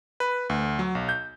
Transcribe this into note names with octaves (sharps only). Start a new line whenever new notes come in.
B4
D2
F#3
B1
G6